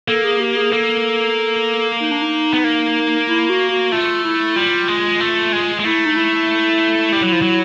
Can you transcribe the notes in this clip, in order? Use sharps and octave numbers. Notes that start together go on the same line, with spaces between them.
A#3 A4
G#4
G4
G#4
A#3 A4
D#4
D4
D#4
B3
A#3
E4
F#4
F#4
A3 F4
E4
G3 F4
G#3
A3
G#3
G#3
A3 E4
D#4
E4
G3
F#3
F3
F#3